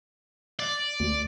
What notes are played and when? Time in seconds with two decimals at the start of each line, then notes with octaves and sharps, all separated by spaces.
0.60 D5
1.00 D2